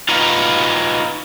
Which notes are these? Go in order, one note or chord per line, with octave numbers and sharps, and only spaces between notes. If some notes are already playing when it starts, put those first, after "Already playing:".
D#4 F4 F#4 B4 D#5 F5